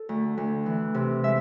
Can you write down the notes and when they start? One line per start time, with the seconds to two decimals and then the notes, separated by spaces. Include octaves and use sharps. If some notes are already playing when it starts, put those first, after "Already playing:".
Already playing: A4
0.09 D2
0.37 D2
0.66 E3
0.94 C3
1.24 G#3 E5